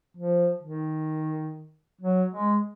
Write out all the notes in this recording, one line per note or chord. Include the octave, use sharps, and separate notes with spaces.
F3
D#3
F#3
G#3